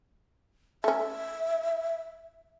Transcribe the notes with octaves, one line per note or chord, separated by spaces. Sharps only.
A3 C#4 E5